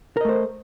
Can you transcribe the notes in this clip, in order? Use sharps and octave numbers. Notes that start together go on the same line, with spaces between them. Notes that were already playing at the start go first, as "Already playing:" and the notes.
A3 A#4 C5 D#5